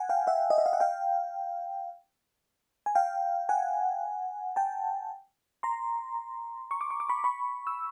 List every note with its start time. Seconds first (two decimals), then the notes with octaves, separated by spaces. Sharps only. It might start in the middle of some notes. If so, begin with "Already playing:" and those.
Already playing: F#5 G#5
0.09 F5 G5
0.27 E5 F#5
0.50 D#5
0.58 E5
0.66 F5
0.73 F#5
0.80 F5 G5
2.86 G#5
2.95 F5 G5
3.49 F#5 G#5
4.56 G5 A5
5.63 A#5 C6
6.71 C#6
6.81 D6
6.90 C#6
7.00 D6
7.09 B5 C#6
7.24 B5 C#6
7.67 E6